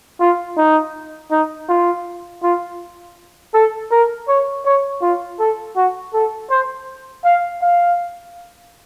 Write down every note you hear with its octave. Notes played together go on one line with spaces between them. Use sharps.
F4
D#4
D#4
F4
F4
A4
A#4
C#5
C#5
F4
A4
F#4
A4
C5
F5
F5